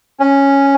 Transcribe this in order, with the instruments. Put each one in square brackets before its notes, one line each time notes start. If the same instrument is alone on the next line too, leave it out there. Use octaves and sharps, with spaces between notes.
[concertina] C#4